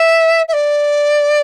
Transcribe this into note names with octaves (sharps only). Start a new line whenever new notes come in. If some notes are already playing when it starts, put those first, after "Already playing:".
Already playing: E5
E5
D5